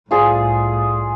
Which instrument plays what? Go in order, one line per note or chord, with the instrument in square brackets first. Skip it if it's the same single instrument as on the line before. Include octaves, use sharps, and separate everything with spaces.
[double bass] C2 A2 [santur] F4 G#4 D5